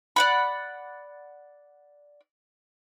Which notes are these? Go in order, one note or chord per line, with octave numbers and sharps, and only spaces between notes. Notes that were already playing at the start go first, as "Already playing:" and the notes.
D5 F#5 B5